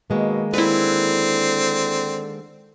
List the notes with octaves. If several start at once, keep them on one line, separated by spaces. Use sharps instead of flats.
B2 D#3 G#3 A#3
D3 C4 E4 B4